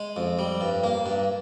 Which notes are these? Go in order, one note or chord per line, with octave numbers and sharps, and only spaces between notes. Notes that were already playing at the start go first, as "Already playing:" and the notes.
Already playing: G#3
F2
G3
G2
A#3
G2